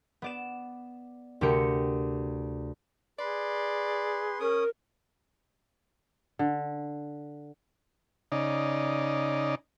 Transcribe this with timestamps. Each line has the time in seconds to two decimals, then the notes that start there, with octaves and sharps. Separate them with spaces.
0.22 B3 D5 E7
1.41 D2 C3 G4 A#4 C#7
3.19 G#4 B4 D5 C6
4.40 C#4 A#4 D#6
6.39 D3
8.32 C#3 D#4 D5